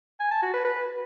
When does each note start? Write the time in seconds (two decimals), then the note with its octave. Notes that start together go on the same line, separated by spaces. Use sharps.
0.20 G#5
0.31 A5
0.42 F#4
0.53 B4
0.65 B4